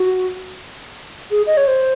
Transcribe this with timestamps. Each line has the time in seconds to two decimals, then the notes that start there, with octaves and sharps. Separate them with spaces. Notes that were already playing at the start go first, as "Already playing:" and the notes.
Already playing: F#4
1.31 G#4
1.47 D#5
1.57 C#5
1.68 C5